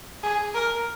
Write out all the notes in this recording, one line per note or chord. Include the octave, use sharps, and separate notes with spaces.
G#4
A#4